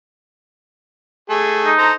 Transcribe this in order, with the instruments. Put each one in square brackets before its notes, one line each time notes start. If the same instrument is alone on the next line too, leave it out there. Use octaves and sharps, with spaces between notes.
[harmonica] A3 G#4 A4
[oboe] D#4
[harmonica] A4 C5 A#5